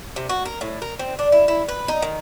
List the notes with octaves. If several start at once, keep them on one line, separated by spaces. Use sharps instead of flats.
C3
F#4
A#4
A2
A#4
C4
D4
E4
E4
B4
D#4
D#3